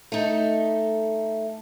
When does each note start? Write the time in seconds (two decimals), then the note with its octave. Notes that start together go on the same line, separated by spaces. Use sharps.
0.12 A3 D#4